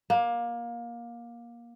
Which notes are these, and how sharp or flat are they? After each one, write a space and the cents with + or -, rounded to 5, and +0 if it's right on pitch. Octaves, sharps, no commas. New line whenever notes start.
A#3 +20